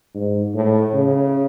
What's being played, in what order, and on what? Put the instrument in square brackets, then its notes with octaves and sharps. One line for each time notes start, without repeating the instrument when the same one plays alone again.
[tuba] G#2
A2
C#3